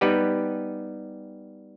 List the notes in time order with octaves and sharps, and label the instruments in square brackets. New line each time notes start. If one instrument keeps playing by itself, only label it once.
[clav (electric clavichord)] G3 B3 D#4 G4 B4